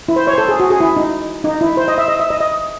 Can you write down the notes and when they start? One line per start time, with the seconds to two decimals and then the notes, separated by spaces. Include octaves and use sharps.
0.09 E4
0.16 C5
0.27 C#5
0.34 C5
0.38 A4
0.48 G#4
0.60 F#4
0.70 G#4
0.80 E4
0.97 D#4
1.44 D#4
1.61 E4
1.77 C5
1.88 D#5
1.98 E5
2.08 D#5
2.20 E5
2.30 D#5
2.40 D#5